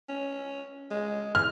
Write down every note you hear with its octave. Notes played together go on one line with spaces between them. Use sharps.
C#4
G#3
E3 F6